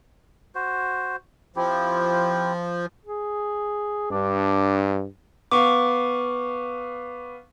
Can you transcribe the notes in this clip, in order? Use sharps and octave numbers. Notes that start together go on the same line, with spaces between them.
F#4 C5
F3 C4 E4 G4
G#4
G2 D4
B3 F5 C#6 D6